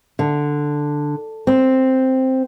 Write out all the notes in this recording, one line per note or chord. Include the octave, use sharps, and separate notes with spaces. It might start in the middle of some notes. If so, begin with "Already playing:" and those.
D3
C4